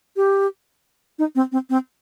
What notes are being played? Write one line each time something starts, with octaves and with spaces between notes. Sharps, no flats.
G4
D#4
C4
C4
C4